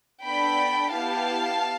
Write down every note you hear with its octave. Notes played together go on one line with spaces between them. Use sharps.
B3 D4 A4 G5 B5
B3 E4 G4 F5 A5